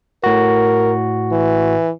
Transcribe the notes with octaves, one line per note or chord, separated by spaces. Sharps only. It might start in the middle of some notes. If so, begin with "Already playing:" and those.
A2 F#4 A#4
E3